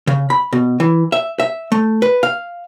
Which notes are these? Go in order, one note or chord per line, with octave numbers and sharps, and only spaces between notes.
C#3
B5
B2
E3
E5
E5
A3
B4
F5